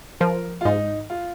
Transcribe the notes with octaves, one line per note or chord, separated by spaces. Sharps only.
F3 A#4
F4
G#2 D#4
F4